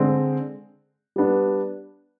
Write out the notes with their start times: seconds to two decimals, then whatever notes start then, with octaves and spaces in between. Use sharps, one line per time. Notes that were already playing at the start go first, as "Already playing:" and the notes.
Already playing: D3 G#3 C4
1.16 G3 B3 D4